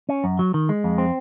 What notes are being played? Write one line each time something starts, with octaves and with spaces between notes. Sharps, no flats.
C#4
F#2
F#3
D#3
G#3
F2
C4